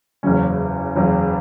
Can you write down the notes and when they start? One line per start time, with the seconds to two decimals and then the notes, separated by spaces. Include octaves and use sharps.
0.23 F#1 E2 C#3 F#3 C#4
0.96 F#1 E2 C#3 F#3